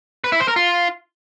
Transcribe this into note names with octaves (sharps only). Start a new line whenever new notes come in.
B4
E4
C5
A#4
F4